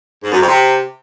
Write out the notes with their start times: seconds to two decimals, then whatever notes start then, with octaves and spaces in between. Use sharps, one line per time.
0.23 G#2
0.31 F#2
0.40 F2
0.48 C3